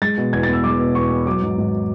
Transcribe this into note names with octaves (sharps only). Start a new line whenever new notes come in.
G#3 A6
B2
E2 G#6
A6
B3
E6
G#3 D6
B2
E2 C#6
B3
F#3 D6
G#2
G#1